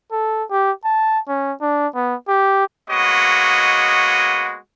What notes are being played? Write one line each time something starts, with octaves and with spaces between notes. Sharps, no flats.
A4
G4
A5
C#4
D4
B3
G4
G#3 A#3 B3 F#4 C#5 D#5